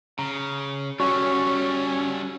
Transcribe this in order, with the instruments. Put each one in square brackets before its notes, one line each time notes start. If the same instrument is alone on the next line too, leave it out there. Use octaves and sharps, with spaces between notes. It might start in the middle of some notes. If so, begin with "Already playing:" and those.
[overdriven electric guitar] C#3 [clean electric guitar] A#5
[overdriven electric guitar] G3 A4 [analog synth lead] C#4 [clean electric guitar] F#4 C#5 [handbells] C#6